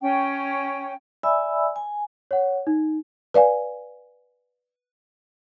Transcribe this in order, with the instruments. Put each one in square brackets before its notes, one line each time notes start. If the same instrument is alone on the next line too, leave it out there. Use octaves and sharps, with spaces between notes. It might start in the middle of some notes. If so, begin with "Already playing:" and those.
[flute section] C#4 G5
[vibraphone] D5 E5 G#5 B5 E6
G#5
[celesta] C#5 F#5
D#4
[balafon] B4 D5 F5 G#5